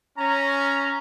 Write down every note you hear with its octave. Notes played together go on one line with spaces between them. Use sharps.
C#4 A#5